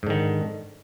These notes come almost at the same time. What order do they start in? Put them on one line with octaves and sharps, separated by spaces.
G#2 D3 D#3